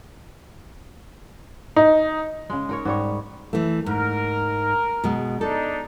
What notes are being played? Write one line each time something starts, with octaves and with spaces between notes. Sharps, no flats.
D#4
C#3 G#3
D#4 A#4 C#5
G#2 G3 C#5
E3 A3
G#2 A#4
B2 G#3
D4 D#4 A4